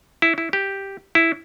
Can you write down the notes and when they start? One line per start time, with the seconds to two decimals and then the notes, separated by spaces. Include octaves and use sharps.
0.22 E4
0.38 E4
0.53 G4
1.15 E4